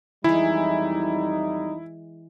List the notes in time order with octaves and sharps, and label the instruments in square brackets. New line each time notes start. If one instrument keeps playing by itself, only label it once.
[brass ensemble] F2 G3 D#4 [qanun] E3 G#3 [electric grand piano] E4